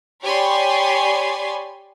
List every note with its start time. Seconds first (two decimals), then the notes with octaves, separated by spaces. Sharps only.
0.23 G4 C#5 D5 G#5 B5 C6